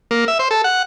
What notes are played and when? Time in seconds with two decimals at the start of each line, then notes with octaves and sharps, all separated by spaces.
0.11 A#3
0.28 E5
0.39 C5
0.51 A4
0.64 F#5